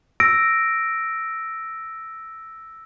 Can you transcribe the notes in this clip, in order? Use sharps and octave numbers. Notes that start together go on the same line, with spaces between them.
E6 A#6 D7